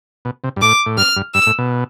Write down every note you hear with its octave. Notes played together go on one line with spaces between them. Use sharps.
B2
C3
G2
A2 D6
A2
G2 F6
G2
G2 E6
A2
B2